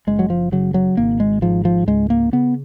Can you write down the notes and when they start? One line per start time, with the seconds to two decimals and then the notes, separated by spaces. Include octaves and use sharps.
0.07 F#1 G#3
0.19 F#3
0.30 F3
0.52 C#3 F#3
0.74 F#3
0.97 G#1 A#3
1.20 G#3
1.42 G#2 F3
1.65 F3
1.87 C#2 G#3
2.10 A#3
2.32 C#3 B3